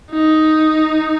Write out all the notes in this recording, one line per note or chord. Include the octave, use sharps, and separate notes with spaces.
D#4